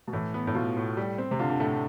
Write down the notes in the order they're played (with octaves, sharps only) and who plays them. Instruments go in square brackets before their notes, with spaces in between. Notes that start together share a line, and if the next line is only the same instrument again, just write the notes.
[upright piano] B2
[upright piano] A2 [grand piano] E3
[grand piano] B3
[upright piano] A2
[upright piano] B2 [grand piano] F4
[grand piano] A2
G3
C4
[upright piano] C3
[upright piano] D3 [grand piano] F4
[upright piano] D3
[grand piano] A2 [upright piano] A3